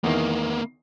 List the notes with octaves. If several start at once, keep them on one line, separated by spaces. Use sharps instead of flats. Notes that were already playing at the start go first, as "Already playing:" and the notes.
E2 D#3 A#3 B3